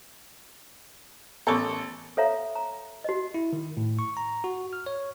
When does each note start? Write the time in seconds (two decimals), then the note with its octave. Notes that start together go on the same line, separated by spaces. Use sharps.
1.47 A1 B3 A4 A#4 C#6
2.17 A4 C#5 E5 F5 A#5
2.55 A#5
3.04 F#4 D#5
3.34 E4
3.53 D#3
3.77 A2
3.99 C#6
4.17 A#5
4.44 F#4
4.73 F6
4.86 C#5